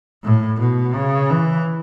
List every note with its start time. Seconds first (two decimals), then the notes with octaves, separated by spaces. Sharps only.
0.24 A2
0.60 B2
0.95 C#3
1.30 E3